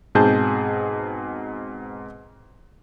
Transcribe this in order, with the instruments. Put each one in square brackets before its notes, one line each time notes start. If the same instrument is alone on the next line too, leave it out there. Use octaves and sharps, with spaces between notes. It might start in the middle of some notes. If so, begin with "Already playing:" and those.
[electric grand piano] G#2 B2 C4 G#4 A5 G6